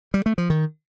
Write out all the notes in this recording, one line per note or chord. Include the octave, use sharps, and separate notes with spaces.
G3
A3
F3
D#3